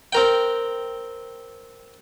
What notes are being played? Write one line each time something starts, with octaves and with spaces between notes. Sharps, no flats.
C4 A#4 G5